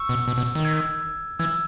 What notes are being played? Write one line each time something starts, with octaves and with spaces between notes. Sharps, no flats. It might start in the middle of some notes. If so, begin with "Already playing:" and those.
Already playing: C#6 E6
B2
B2
B2
D#3
E6 G#6
E3 E6 G#6